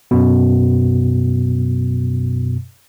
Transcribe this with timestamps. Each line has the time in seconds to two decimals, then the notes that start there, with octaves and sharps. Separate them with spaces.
0.11 F#2 B2